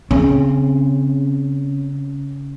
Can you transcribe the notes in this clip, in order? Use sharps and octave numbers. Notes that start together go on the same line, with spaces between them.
C#3 C4 C#4